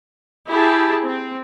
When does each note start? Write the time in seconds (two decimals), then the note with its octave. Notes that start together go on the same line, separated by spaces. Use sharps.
0.49 E4 G4 G#4 A5
1.04 C4